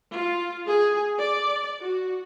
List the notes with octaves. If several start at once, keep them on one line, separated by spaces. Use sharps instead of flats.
F4
G#4
D5
F#4